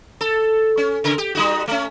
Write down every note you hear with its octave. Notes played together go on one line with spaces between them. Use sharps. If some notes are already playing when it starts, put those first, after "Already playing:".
A4
C#4
C#3 A#4
G4
G3 D#4 F#4
A3 C#4